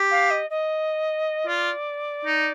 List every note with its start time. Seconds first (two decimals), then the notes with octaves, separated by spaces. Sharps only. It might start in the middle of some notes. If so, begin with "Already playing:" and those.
Already playing: G4
0.11 F5
0.30 D#5
0.50 D#5
1.47 F4 D5
2.25 D#4